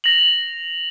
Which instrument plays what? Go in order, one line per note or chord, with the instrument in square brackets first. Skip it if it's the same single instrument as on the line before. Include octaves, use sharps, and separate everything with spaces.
[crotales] A#6 F7 F#7